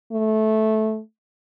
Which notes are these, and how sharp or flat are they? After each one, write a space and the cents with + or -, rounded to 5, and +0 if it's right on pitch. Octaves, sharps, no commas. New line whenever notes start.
A3 -15